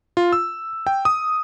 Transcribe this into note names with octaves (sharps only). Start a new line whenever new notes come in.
F4
E6
G5
D#6